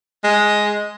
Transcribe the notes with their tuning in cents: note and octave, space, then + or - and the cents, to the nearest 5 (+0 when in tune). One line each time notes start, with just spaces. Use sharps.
G#3 +5